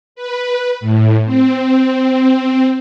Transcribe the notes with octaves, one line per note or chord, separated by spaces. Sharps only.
B4
A2
C4